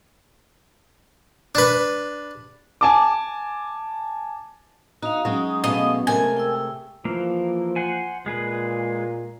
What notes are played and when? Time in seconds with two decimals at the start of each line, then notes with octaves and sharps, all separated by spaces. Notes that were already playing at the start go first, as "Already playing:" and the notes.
1.55 D4 B4
2.81 G#5 A5 D6
5.02 D#4 F#4 F5 D#6
5.25 F#3 G#3 C#4 D#4
5.64 B2 G#3 A3 D#5 F5
6.07 C3 G#3 A3 A#4 G#5
6.37 G5 E6
7.05 E3 F3 A#3
7.76 C5 F#5 G#5
8.26 A#2 G#3 G#4 B4